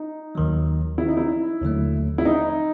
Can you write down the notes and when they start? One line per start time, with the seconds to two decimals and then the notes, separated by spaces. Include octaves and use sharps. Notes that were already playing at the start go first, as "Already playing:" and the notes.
Already playing: D#4
0.35 D#2 D#3 F#3
0.98 E4
1.08 D#4
1.17 E4
1.62 D#2 D3 F#3 A3
2.18 E4
2.25 D#4